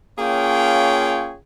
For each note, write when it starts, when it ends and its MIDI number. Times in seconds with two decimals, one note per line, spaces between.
0.19 1.34 58
0.19 1.34 61
0.19 1.34 65
0.19 1.34 68
0.19 1.34 73
0.19 1.34 79